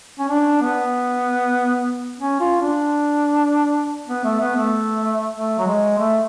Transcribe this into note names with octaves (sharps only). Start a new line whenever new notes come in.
C#4
D4
B3
C#4
F4
D4
B3
A3
B3
A3
A3
F#3
G#3
A3